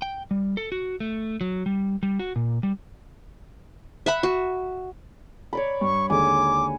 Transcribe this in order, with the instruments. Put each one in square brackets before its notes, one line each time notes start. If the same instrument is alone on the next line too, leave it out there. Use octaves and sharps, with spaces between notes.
[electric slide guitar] G5
G3
A4
F#4
A3
F#3
G3
G3
F#4
A#2
G3
[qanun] E5 F#5 B5
F#4
[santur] C#5 D5 B5
[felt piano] G2 [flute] C#6
[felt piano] D#2 D3 G#3 [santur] G#5 [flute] D6